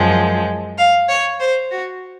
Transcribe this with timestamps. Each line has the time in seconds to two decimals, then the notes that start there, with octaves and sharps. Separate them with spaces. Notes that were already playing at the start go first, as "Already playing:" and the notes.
Already playing: F#2 F3 G#3
0.77 F5
1.08 C#5
1.40 C5
1.70 F#4